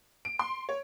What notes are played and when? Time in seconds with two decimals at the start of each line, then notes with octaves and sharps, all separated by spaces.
0.25 D7
0.39 C6
0.69 C#5